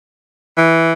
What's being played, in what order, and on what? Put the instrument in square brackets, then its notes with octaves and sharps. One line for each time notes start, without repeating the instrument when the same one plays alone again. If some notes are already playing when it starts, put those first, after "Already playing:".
[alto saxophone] E3